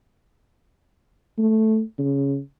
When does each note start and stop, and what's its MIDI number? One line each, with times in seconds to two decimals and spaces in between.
1.38 1.82 57
1.99 2.39 49